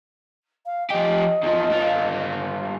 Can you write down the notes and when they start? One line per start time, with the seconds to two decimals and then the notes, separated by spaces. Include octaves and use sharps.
0.66 F5
0.90 F3 G4 D#5
1.43 E2 F3
1.70 G2 F4